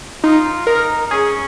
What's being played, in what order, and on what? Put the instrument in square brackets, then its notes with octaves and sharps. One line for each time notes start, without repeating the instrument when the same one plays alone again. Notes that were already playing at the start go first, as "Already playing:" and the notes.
[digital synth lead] D#4 [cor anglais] F4
[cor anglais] D#4 [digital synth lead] A#4
[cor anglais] D#4
[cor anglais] C#4 [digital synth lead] G#4